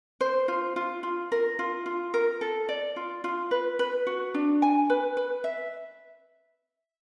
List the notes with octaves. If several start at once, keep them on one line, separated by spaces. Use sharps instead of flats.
C5
F4
F4
F4
A#4
F4
F4
A#4
A4
D5
F4
F4
B4
B4
F#4
D4
G#5
B4
B4
E5